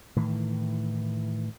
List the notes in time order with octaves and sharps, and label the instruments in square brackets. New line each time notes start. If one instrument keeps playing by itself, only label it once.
[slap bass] A2 D#3 E3